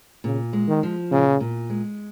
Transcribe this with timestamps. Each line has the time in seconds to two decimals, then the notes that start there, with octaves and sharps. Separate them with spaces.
0.24 A#2 C#3
0.53 G#3
0.68 D#3
0.83 F3
1.11 A#2 C#3
1.40 A#2
1.70 G#3